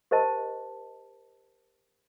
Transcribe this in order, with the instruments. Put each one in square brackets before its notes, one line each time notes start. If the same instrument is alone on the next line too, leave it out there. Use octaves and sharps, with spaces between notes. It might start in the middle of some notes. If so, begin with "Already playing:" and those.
[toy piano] G4 A#4 C5 D#5 A5